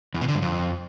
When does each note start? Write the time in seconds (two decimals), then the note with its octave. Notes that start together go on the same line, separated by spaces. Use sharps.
0.14 E2
0.21 B2
0.28 D3
0.35 G2
0.42 F2